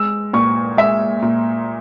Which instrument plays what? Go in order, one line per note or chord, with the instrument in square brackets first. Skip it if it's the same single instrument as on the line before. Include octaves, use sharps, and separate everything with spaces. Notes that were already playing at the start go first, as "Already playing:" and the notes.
Already playing: [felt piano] G#3 [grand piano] E6
[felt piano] A#2 [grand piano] C#6
[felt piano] G#3 [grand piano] E5
[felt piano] A#2